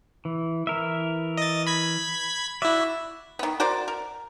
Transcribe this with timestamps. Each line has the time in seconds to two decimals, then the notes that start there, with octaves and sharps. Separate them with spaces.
0.25 E3
0.67 E3 A#4 E5
1.38 D#5 A6
1.67 B5 G#6 B6
2.62 E4 F#4 D5 E5
3.39 D#3 B3
3.60 F#4 A#4 C5 D5
3.88 A#4